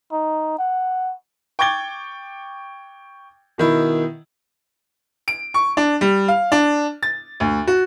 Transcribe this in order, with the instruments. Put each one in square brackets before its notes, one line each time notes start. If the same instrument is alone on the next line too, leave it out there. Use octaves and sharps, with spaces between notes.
[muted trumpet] D#4
F#5
[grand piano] G5 C#6 D6 G#6 A6 G7
B2 D#3 E4
[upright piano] D7
C#6
D4
G3
F5
D4
A6
D2
F#4